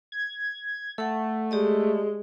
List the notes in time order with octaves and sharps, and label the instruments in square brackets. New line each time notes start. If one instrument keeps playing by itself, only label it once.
[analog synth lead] G#6
[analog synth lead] A3 [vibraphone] A4 F#5
[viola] G#3 [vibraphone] G4 D5 D#5